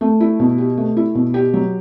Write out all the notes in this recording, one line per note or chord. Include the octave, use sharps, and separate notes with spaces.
A3
E4
B2
G4
A3
E4
B2
G4
F#3